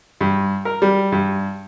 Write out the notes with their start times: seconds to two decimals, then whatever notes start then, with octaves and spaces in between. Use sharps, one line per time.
0.21 G2
0.65 A#4
0.82 G3
1.12 G2